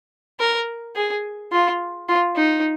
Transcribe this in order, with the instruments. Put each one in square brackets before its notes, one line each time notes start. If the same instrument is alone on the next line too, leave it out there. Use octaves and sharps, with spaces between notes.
[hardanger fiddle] A#4
G#4
F4
F4
D#4